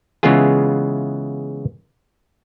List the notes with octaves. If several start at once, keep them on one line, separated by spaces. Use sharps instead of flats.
C#3 E3 G#3 B3 F4 G#4